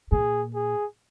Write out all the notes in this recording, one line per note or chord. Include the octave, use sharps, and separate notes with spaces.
A#2 G#4
G#4